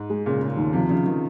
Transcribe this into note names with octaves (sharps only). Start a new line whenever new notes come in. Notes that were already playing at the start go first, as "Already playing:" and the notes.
Already playing: G#2
G#3
A#2 C#3
C#3
D#2
C3 F3
C#3 F3
D#3 F3